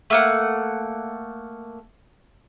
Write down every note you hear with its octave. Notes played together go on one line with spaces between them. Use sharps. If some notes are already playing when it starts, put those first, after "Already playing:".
A3 A#3 F#5